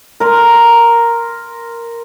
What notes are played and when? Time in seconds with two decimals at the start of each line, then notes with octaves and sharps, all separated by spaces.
0.20 A#4 C6